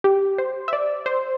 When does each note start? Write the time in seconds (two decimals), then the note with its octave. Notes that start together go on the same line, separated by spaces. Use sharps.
0.04 G4
0.38 C5
0.68 E5
0.73 D5
1.06 C5